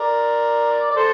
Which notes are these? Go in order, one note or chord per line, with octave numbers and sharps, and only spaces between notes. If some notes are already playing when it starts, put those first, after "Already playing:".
Already playing: A#4 D5
D5
A4 C5